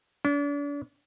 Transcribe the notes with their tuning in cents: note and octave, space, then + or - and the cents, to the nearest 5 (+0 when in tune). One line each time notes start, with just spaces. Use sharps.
D4 -40